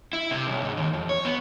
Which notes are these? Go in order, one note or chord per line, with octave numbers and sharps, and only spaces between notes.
E4
C3
B1
G#2
D#2
F2
C#5
B3